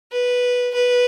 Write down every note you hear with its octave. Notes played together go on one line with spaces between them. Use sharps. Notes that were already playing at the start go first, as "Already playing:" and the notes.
B4
B4